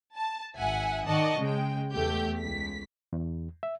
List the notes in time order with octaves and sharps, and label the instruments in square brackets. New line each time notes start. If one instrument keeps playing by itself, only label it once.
[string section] A5
G#1 E5 F#5 G#5
D#3 D5 D#5 F#5 A5 C#6
C#3 G#3 G5
E2 A3 G4 G6
C#2 B6
[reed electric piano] E2
E5